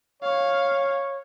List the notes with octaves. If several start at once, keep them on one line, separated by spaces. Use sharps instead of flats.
C#5 F5